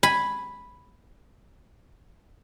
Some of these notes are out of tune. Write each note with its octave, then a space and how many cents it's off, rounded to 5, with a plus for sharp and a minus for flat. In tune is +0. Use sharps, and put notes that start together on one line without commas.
G#5 +0 B5 +0